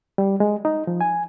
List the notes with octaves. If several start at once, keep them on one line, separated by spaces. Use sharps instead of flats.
G3
G#3
D#4
F3
G#5